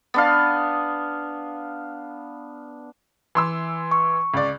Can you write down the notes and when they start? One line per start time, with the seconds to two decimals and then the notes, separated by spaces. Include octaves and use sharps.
0.14 B3 D4 F5
3.35 E3 C6 E6
3.91 C#6
4.34 C#2 D5